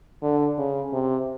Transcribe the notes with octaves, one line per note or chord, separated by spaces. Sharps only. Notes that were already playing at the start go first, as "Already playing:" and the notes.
D3
C#3
C3